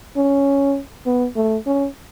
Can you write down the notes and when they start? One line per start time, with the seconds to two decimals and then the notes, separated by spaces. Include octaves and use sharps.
0.16 C#4
1.06 B3
1.36 A3
1.66 C#4